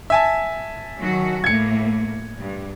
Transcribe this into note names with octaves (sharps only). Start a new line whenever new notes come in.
E5 G#5 A5
D#3 F#3 F#4
A2 A3 A#3 G#6 C#7
G2